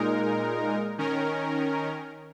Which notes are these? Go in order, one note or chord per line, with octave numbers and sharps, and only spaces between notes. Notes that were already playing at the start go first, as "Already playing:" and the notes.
Already playing: A#2 G#3 D#4 A#4
D#3 C#4 A#4